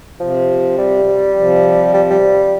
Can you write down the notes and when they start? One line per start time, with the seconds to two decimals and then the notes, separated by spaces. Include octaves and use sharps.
0.19 C3 F3
0.78 G3
1.36 C3 F3
1.94 G3
2.10 G3